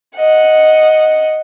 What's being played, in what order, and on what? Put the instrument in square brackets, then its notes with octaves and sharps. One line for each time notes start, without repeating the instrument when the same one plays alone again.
[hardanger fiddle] D#5 F#5